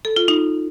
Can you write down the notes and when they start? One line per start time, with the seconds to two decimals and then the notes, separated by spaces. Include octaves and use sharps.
0.05 A4
0.16 F4
0.28 D#4